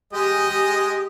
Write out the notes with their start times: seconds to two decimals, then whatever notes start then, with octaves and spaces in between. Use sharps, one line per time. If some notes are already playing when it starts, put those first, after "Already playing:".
0.13 G#3 G4 G#4 D#5 G5 D#6
0.47 G4